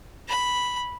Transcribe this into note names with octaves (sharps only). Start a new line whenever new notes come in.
B5